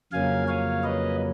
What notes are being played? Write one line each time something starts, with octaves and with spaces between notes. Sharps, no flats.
F2 C#3 F#3 A#3 C#4 F5 G#5
C#5 F5
B4 D#5